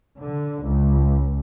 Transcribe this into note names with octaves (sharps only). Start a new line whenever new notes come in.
D3
C#2